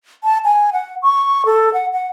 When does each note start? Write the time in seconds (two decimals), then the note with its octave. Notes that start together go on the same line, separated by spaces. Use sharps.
0.24 A5
0.45 G#5
0.73 F#5
1.03 C#6
1.46 A4
1.74 F#5
1.93 F#5